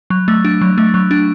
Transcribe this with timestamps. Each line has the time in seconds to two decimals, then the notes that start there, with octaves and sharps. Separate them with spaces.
0.10 F#3
0.28 A3
0.45 D4
0.61 F#3
0.78 A3
0.94 F#3
1.11 D4